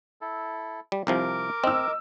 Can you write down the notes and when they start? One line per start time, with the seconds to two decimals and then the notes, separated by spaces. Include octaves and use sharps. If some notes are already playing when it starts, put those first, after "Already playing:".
0.21 E4 A4
0.92 G3
1.07 C2 C3 F3 A#4 D6
1.64 C4 D#5 E6